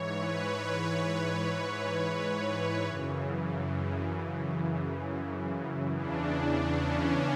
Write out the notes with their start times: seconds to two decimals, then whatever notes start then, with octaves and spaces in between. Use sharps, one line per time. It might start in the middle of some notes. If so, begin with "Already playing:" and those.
Already playing: G#2 E3 C#5
0.14 B4
2.86 F#2 C#3 E3
5.96 E2 C#3 E3 D4
6.36 D4
6.75 C#4